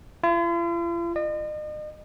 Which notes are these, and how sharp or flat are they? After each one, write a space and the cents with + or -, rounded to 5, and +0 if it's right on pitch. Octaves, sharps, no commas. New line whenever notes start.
F4 -45
D#5 -40